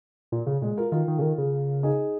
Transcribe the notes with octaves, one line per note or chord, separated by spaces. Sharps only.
A#2
C#3
A#2 G#3
F4 A#4
D#3 F4 A#4
D#3
C#3
D#3
C#3
D#4 G#4